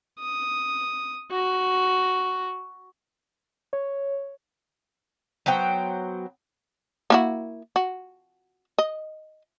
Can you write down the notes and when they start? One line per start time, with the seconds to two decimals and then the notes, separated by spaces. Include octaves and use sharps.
0.20 D#6
1.32 F#4
3.73 C#5
5.46 F#3 B3 C5 G5
7.10 A#3 E4 F#4
7.76 F#4
8.78 D#5